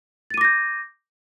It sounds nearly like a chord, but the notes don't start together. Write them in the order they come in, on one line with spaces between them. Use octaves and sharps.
A6 D#7 D6 A#6 G6